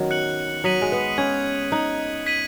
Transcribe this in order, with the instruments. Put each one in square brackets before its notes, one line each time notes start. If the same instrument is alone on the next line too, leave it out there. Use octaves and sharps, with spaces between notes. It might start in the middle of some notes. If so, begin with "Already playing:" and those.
Already playing: [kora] D#3 F#3 B3 C#4
[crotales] F#6 C#7 F#7
[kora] F#3 [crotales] D#6 B6 D#7 F#7
[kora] G#3
B3
[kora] C#4 [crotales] D#6 G#6 B6
[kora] D#4 [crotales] F#6 C#7 F#7
[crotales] G#6 B6 D#7 F#7